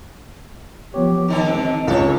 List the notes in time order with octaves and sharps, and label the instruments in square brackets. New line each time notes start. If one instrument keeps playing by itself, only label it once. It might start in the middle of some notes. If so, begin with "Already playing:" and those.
[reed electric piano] F3 B3 C#5 [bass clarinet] G4
[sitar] D3 D#3 A4 [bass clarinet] D#4
[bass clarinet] G#3 [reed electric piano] C4
[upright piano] C#2 [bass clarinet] G#3 [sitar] A4 C#5